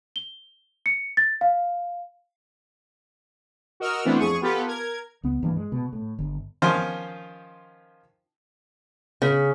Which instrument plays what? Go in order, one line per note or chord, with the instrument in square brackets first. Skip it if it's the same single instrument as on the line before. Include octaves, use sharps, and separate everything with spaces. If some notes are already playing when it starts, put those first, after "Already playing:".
[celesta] G7
C#7
A6
F5
[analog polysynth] F#4 A#4 D#5 E6 F6
E3 A3 B3 C4 D4 E4
F2 G#4 C#6 D#7
B3 F4 G4 A4 B4
A#4 G#6
[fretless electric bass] C#2 B3
G2 E3 A#3
G#3
B2
A2
G1
[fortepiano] D#3 F3 C#4 F4 C5
[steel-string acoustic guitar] C#3